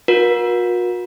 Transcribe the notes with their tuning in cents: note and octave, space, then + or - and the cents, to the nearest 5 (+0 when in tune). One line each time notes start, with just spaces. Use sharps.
F#4 -45 A#4 +40